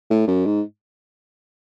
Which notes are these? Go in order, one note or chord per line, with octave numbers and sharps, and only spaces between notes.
A2
F#2
G#2